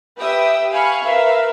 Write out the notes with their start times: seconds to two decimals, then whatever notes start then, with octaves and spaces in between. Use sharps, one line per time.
0.17 G4 B4 E5 G5 D#6 E6
0.72 F5 G#5 B5 C#6 F6
1.03 A#4 B4 E5 F5